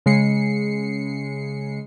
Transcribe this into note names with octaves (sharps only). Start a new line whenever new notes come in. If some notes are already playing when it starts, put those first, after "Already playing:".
C#3 G#3 C7 C#7